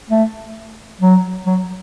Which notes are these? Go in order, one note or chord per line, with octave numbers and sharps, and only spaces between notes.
A3
F#3
F#3